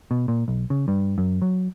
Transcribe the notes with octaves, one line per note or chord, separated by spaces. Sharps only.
B2
A#2
B1
C#3
G2
F#2
F#3